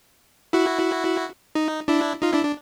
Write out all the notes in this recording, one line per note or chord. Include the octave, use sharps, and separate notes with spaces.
E4 F#4
D#4
D4 E4
D#4 F4
D4 E4
D4